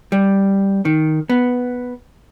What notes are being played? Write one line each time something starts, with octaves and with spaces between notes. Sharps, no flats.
G3
D#3
B3